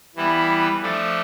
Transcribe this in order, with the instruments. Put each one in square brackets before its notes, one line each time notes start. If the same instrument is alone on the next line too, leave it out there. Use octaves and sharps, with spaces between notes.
[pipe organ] E3 G3 B3 E4 B4
F3 A3 D4 A4